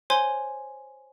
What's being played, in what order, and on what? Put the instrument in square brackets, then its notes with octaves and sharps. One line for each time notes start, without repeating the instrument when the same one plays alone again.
[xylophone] C5 C#5 G#5 C6 G7